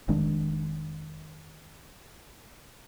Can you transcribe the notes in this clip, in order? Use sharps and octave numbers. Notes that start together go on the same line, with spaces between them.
F1 D#3 G#3 D4